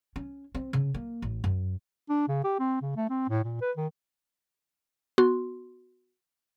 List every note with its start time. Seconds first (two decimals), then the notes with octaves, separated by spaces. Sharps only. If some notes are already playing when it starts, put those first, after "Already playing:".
0.16 C#4
0.55 C4
0.73 C#3
0.95 A#3
1.22 A1
1.44 F#2
2.09 D4
2.28 C#3
2.44 G4
2.59 C4
2.82 C#3
2.96 A3
3.10 C4
3.29 A2
3.44 A#2
3.61 B4
3.77 D#3
5.18 B3 F#4 C6